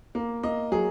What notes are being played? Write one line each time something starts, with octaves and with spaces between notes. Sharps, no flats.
A#3
A#3 D#5
F#3 G#4